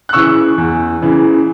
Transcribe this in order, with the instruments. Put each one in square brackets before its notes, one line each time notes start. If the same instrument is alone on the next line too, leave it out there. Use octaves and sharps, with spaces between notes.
[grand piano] F#6
C#3 E3 C#6 E6
E2
C#3 E3